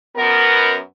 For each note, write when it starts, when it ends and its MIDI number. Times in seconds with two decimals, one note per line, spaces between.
0.16 0.78 42
0.16 0.78 59
0.16 0.78 70